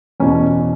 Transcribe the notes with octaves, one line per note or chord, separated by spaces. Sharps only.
E2 B2 C#4